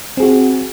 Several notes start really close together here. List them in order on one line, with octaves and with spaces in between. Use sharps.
C4 G#4 F#4